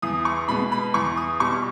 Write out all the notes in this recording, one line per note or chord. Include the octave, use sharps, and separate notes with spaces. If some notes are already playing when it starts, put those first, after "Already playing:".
E2 D#6
C#6
B2 G#3 B3 B5
B5
E2 C#6
D#6
B2 G3 C#6